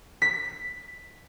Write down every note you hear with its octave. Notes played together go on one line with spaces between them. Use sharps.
B6